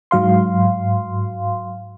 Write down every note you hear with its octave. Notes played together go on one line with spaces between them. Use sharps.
G#2 F#3 F5 C6